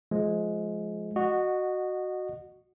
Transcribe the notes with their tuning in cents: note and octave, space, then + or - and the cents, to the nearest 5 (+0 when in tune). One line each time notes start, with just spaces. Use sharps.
F3 +0 G#3 +20
F#4 +0 D#5 -25 F#5 -15